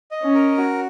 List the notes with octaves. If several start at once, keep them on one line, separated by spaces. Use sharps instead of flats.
D#5
C#4
A#4
F#4